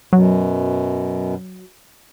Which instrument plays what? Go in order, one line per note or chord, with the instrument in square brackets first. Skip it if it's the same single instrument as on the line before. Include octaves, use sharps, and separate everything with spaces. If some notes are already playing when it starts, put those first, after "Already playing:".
[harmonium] F#2 B2 [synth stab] F#3